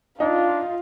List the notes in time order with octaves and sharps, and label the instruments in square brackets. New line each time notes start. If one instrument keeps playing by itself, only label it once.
[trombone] D4 [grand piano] D#4 [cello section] F4 [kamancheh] F5